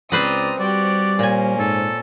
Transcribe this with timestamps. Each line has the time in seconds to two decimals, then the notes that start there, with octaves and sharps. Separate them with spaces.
0.12 C#2 C4 B4 C5 D5 A#5 D#6
0.60 G3 F#4 G4 D5
1.19 A#2 A#3 C#4 C5 G#5
1.59 G#2 A4